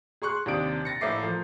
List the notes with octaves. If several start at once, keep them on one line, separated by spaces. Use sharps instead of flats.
G#4 C6 C#6 F#6
D#2 C3 D4 D5 D#6 D7
A6 A#6 C#7
A#1 A2 A#4 E5 D6 C7
F3 A3 A#4